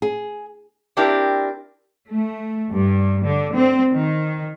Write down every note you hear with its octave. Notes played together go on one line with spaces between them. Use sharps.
G#4
C4 D4 E4 G4 A#4
A3
G2
D3
C4
D#3